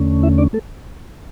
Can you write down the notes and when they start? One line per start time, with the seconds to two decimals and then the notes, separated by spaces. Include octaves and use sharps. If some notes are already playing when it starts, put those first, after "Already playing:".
Already playing: E2 D3 A3 C#4
0.23 E4 E5
0.38 D4 D5
0.53 A3 A4